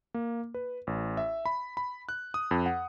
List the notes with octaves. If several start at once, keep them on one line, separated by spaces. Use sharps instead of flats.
A#3
B4
A1
E5
B5
B5
F#6
D#6
F2
F#5